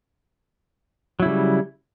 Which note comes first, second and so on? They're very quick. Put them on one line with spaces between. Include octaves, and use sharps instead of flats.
F#3 E4 C#3 G3